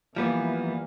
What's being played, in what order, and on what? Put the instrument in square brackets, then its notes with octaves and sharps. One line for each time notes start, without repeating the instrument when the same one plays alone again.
[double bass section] E3 [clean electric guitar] F3 G3 B3 [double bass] A#3